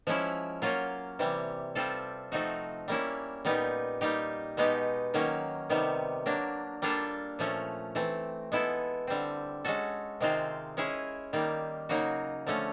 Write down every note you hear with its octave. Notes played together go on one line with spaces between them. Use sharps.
F3 G#3 C#4 E4
F#3 A#3 C#4 F4
C3 E3 G3
G3 C4 F4 A4
F3 A3 C4 D#4 F#4
G3 A#3 C#4 E4
A#2 G3 B3 D#4 G4
G3 A#3 D#4 G4
B2 G#3 B3 D#4 G4
D#3 F#3 A#3 C#4
C3 D#3 G3 B3
F#3 A#3 D4
G3 A#3 D4 F4 A4
A#2 F3 A3 C#4
E3 A3 C4
G#3 B3 E4 A4
D3 G3 C4
G#3 C#4 F#4 A4
C3 D#3 G#3 C4 F4
G#3 C#4 E4 G#4
D#3 G3 A#3
C#3 F#3 A#3 D#4 F#4
D3 F3 A3 C#4